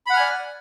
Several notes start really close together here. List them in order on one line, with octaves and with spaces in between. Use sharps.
B5 F#5 F6 G#5 D5